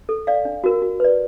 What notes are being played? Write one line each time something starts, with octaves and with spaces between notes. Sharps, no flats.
A4
D5 F5
D4
F#4 A#4
F#4
B4 D5